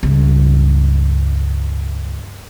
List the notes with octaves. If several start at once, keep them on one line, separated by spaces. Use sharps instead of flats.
C#2 G2